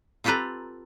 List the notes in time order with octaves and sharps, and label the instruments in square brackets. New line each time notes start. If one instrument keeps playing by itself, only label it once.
[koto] C4 F4 G4 A4 B4 A#5